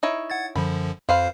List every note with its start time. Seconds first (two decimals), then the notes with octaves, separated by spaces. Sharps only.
0.03 D#4 E4 C#5
0.30 F#5 G#6 A6
0.56 F#2 D3 F3 B5
1.09 F2 F4 B4 C5 F5 C7